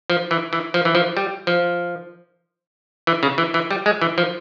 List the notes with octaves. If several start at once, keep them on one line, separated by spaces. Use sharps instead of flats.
F3
E3
E3
F3
E3
F3
G3
F3
E3
C#3
E3
E3
G3
G#3
E3
F3